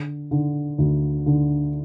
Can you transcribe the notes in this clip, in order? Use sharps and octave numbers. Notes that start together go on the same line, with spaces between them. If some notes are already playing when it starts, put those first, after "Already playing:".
Already playing: D3
D3
D2
D3